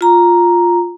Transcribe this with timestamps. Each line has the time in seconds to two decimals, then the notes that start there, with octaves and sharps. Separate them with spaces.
0.01 F4 A#5